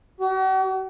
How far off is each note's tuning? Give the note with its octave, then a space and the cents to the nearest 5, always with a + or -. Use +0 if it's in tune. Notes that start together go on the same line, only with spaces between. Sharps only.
F#4 +45